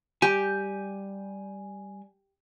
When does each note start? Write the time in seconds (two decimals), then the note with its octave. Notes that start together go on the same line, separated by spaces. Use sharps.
0.22 G3 G4 G#5